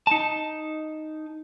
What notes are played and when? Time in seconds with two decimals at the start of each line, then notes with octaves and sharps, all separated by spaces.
0.07 D#4 A5